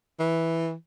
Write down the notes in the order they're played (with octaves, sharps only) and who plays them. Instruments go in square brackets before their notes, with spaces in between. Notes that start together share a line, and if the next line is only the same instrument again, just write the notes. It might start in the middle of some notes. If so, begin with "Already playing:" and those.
[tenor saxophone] E3